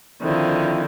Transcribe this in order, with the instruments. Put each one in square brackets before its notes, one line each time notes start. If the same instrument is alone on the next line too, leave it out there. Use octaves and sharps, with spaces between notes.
[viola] D3 D#3 [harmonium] F3 C4 E4